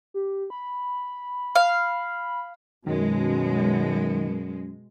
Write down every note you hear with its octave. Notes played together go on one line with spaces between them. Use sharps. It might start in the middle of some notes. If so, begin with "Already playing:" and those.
G4
B5
F5
F#2 B2 D#3 G#3